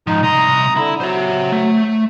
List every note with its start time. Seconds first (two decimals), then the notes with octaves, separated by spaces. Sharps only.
0.07 G#2 F3 D#4
0.23 C2 A#5 C6 D#6
0.77 D3 E4
1.01 F#3 C5 E5
1.52 A3